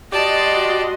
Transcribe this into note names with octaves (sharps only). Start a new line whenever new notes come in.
F#4 G4 D5 D#5 A5 C6